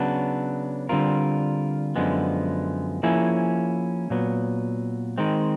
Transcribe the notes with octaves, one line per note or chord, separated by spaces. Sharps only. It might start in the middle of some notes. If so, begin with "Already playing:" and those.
Already playing: C#3 F#3 B3 D4
D3 G3 C4 F4 A#4
F#2 D3 F3 G#3 B3
F3 A#3 C#4 E4 G#4
A#2 F#3 B3
D#3 G#3 C4